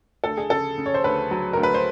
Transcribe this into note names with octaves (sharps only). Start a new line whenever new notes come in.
D2 A4
G#4
C#3 A4
C#3
C#5
C5
D2 B4
F#3
D2 A#4
B4
C5